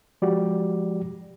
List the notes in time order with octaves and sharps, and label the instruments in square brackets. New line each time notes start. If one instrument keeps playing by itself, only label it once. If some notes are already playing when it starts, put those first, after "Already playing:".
[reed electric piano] F3 G#3 F#4 G4 D5